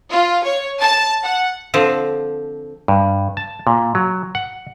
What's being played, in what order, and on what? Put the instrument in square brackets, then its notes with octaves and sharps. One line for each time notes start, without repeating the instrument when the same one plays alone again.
[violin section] F4
C#5
A5
F#5
[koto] D3 F3 C4
[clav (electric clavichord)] G2
A5
A#2
F#3
F#5